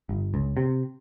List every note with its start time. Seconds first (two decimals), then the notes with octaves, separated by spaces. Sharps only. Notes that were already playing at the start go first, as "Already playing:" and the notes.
0.09 G1
0.34 C#2
0.57 C3